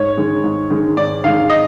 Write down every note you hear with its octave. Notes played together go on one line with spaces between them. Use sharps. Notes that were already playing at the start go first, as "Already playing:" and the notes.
Already playing: G#2 C#5
D#3 G#3
G#2
D#3 G#3
G#2 D5
D#3 G#3 F5
D#5